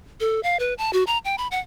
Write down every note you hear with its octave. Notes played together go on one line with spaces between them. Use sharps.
A4
F5
B4
A5
F#4
A#5
G5
B5
F#5